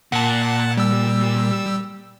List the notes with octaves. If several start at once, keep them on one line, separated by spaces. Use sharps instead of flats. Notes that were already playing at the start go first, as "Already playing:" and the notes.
A#2 F#5 A5
G3 E6